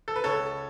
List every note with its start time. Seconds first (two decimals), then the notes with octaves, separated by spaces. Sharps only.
0.08 A4
0.16 B4
0.24 C#2 A4 C#5